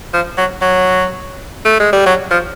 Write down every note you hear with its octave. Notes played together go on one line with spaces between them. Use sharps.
F3
F#3
F#3
A3
G#3
G3
F#3
F3